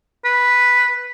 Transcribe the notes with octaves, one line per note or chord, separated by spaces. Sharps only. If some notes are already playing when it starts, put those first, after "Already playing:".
B4